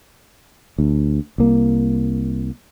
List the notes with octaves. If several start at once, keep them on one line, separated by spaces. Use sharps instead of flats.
D2
C2 A#3